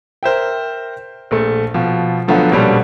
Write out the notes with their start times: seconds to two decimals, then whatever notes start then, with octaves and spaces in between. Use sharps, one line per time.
0.23 A#4 C5 E5 G5
1.31 A#1 A3
1.74 B2 F3
2.28 D3 F3 F#3 A3 B3
2.51 A#1 B2 G3 C#4 A4